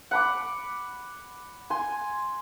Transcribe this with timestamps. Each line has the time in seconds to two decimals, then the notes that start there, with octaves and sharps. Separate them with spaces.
0.11 F#5 B5 D6
1.70 G#5 C6